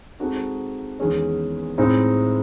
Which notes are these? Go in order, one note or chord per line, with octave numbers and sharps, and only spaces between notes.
G#3 C4 D#4 F#4 A4
E2 D#3 G#3 C#4 G#4
A2 G#3 C4 D#4